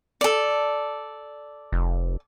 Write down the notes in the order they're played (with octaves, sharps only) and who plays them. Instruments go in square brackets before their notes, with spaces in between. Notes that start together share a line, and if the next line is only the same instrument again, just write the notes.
[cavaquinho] A4 D5
[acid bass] F1